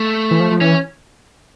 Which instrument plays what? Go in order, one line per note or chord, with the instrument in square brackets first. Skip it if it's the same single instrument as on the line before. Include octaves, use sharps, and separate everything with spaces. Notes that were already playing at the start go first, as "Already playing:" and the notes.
Already playing: [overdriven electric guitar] A3
[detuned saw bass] E3
F3
F3
[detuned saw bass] E3 [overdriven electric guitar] C#4